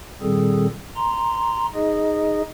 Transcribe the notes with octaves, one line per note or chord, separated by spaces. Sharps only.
A#2 D#3 G3 C4 G#4 A4
A#5 C6
D#4 G#4 D#5